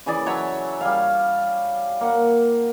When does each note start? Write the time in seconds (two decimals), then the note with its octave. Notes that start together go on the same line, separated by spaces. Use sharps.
0.06 C#3 E3 G#4 D5
0.26 F#3 C#5 E5 A5
0.81 G3 F5
2.01 A#3 F#5